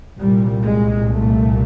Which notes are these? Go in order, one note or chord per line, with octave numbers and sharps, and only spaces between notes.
C2 A#2 G3
G#3
A3